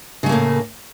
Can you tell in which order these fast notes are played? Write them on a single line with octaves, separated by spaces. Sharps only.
C#3 A3 A#3 A2